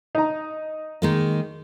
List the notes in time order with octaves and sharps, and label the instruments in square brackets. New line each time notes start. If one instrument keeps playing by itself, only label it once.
[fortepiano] D#4 A#5
[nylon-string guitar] D#3 G#3 A#3